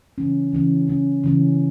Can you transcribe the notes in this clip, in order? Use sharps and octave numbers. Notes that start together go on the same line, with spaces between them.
C#3 E3 C#4
C#3 E3 C#4
C#3 E3 C#4
C#3 E3 C#4